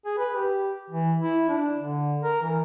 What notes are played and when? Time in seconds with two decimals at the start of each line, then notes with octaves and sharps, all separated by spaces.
0.06 G#4
0.18 B4
0.35 G4
0.90 E3
1.21 E4
1.49 D4
1.78 D3
2.24 A#4
2.42 E3